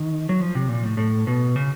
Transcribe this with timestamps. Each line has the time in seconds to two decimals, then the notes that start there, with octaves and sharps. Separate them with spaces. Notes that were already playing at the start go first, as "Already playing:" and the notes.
Already playing: D#3
0.29 F#3
0.41 F3
0.55 C3
0.68 A#2
0.83 A2
0.97 A2
1.27 B2
1.56 C#3